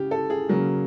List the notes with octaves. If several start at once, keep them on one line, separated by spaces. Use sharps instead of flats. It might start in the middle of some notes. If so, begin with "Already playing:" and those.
Already playing: C#3 G4
A4
G#4
C#3 F#3 A#3